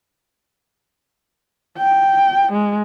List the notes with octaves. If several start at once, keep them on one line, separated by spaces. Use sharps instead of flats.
G5
G#3